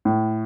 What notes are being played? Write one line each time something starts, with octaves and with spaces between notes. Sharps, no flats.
A2